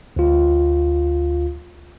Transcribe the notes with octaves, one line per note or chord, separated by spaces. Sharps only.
D2 F4